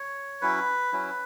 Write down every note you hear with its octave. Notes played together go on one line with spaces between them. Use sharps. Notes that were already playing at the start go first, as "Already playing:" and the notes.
Already playing: C#5
F#3 C#4 E4 B4
F#3 C#4 E4